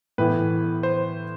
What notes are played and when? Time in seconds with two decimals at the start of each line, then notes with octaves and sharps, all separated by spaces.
0.18 A2 E3 B3 B4
0.83 C5